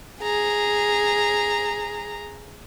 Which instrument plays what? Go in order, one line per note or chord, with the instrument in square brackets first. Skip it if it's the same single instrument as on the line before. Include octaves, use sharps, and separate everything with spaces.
[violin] G#4 A#5